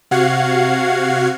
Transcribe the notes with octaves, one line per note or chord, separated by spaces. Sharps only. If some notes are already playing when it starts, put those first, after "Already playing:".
C3 F#4 F5 F#5 G#6 C7